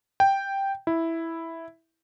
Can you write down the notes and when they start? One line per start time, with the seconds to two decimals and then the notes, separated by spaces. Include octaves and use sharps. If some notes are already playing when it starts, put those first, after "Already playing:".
0.20 G5
0.87 E4